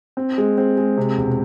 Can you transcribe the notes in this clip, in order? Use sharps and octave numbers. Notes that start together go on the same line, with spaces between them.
C4
G#3
C4
G#3
C3
E1